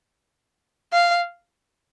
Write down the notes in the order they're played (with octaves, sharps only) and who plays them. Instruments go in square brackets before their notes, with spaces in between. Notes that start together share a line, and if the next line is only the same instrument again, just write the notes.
[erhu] F5